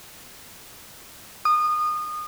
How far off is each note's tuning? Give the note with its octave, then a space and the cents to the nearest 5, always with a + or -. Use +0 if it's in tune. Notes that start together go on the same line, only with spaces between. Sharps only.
D#6 -25